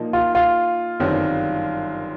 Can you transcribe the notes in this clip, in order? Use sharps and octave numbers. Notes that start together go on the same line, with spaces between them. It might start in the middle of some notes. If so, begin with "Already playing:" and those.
Already playing: A#2 F3 A#3 D#4
F4
F4
G1 F#2 D#3 G3 C4